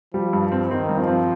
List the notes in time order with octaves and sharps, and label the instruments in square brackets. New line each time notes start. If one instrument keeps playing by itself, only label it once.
[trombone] F3 [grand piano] G3
[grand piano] G2
C4
[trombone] D#3 [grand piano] C4
[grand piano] G2
[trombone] F3
[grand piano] C4